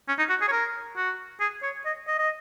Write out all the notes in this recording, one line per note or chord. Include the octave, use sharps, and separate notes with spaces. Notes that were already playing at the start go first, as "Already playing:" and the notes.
C#4
D#4
F#4
G#4
C#5
A#4
F#4
G#4
C#5
D#5
D#5
D#5